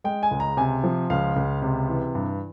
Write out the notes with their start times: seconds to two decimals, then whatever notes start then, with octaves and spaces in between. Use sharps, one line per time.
0.04 G#3 G5
0.23 G#5
0.31 C#2
0.40 A#5
0.57 C3 G#5
0.84 F3
1.10 C#2 F5
1.36 C#2
1.62 C3
1.89 E3
2.15 G2